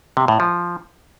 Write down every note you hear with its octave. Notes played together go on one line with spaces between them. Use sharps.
C3
A2
F3